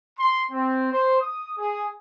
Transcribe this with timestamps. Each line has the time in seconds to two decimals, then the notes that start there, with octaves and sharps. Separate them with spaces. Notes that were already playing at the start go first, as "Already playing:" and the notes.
0.18 C6
0.50 C4
0.92 C5
1.20 D#6
1.58 G#4